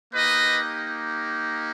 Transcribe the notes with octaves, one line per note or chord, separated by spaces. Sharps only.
A#3 D#4 G4 B4 D#5